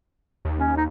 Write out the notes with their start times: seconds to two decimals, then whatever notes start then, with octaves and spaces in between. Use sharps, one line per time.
0.45 D#2
0.59 C#4
0.77 D#4